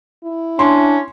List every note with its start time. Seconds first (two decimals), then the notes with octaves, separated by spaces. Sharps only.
0.24 E4
0.59 C#4 D4 C6